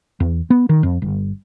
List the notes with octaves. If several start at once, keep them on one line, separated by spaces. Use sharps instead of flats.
E2
B3
D#3
F2
G1